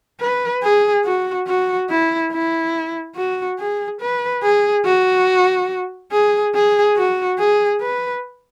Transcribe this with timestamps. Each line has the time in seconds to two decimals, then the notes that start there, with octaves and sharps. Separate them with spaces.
0.20 B4
0.63 G#4
1.05 F#4
1.47 F#4
1.90 E4
2.32 E4
3.16 F#4
3.59 G#4
4.01 B4
4.42 G#4
4.85 F#4
6.12 G#4
6.54 G#4
6.97 F#4
7.39 G#4
7.81 B4